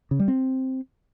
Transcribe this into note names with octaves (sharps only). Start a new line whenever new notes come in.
C#3
G3
C4